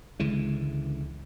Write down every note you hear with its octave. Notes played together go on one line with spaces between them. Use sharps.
C#2 D3 E3 G#3